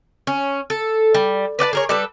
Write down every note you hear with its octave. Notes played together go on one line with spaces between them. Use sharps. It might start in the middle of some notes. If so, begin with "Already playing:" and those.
C#4
A4
G3
B4 D5 F#5 A5
G#4 A#4 C#5
G3 A4 B4